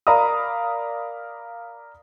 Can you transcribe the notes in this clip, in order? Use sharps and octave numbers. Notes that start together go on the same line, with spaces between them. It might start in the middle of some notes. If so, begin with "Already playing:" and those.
A#4 D5 F5 A#5 B5 D#6